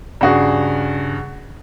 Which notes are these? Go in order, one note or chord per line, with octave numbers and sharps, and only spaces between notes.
G2 C#3 F#4 G#4